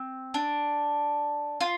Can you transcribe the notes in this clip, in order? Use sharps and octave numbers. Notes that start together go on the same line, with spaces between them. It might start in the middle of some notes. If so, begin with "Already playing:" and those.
Already playing: C4
D4
F4